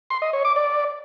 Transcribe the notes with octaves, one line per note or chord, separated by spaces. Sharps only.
C6
D#5
C#5
D6
D5